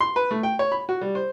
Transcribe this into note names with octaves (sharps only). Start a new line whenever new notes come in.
C6
B4
A3
G5
C#5
B5
F#4
G3
C5